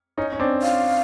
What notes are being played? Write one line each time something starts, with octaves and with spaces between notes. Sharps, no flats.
C#4 D#4
C#4
C4 D4
F5